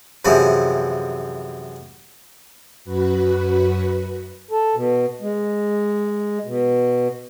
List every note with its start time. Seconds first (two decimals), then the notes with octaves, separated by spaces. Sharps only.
0.25 F#2 C3 E3 F3 G#3
2.85 F#2 F#4 B4
4.51 A4
4.76 B2
5.21 G#3
6.46 B2